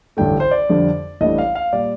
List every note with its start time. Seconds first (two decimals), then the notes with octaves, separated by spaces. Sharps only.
0.17 A1 G2 D3 A3 G5
0.40 C5
0.51 D5
0.70 F2 D3 G3 D4
1.21 A1 A2 G3 D4 D#5
1.38 F5
1.55 F5
1.72 A#2 G3 D5